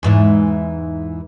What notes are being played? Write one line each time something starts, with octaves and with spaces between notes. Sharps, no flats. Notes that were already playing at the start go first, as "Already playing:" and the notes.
E2 G#2 E3